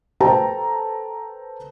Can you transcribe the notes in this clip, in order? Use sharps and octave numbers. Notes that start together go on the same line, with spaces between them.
A4 B4 C5 G5 A5 A#5